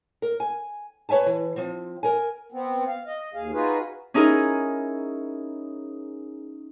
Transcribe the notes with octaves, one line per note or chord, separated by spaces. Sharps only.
A#4
G#5
B4 C#5 E5 G#5 A5
E3
F3 C4
A#4 G#5
B3 C4
F5
D#5
D#2 G#4 F5
D#4 F4 F#4 G#4 B4
C#4 D#4 E4 G#4 A#4